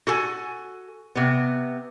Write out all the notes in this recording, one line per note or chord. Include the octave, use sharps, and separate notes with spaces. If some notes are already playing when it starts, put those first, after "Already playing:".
F#4 A4 G#5
C3 B3